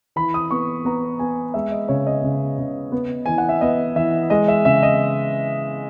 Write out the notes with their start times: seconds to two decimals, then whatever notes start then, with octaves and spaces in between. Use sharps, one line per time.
0.16 E3 B5
0.34 D#6
0.51 B3 C#6
0.85 B3 A#5
1.19 B3 G#5
1.54 G#3 E5
1.72 D#5
1.88 C#3 C#5
2.07 D#5
2.24 C#3
2.59 C#3
2.92 B3
3.26 E3 G#5
3.38 F#5
3.49 E5
3.61 B3 D#5
3.96 E3 E5
4.30 G#3 D#5
4.48 E5
4.65 C#3 E5
4.83 D#5